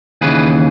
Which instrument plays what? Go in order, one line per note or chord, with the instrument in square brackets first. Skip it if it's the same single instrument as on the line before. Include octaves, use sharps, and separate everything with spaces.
[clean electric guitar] D#2 C#3 E3 G#4 B4